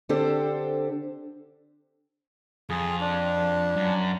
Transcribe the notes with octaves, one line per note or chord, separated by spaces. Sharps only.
D3 C4 D4 G4 A4 C5
F2 G#4
D4
F#2